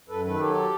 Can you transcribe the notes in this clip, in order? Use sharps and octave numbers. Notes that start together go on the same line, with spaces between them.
F#2 A4 B4
D#3 A4 B4
F#3 G4 A4